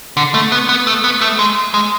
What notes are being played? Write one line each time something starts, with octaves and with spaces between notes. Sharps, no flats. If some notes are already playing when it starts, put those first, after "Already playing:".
D3
A3
B3
B3
A3
B3
A3
G#3
G#3